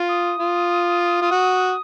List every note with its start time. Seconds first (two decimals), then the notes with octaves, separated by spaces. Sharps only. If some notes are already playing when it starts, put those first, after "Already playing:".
Already playing: F4
0.09 D#6
0.39 F4
1.22 F4
1.31 F#4